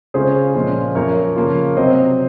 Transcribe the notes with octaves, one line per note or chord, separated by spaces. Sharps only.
C#3 G#3 C#4 F4 G#4 C5
A#2 F3 G#3 C#4 F4
F#2 F3 A#3 A#4 C#5
C#3 F3 A#3 F4
C3 F#3 C4 C5 D#5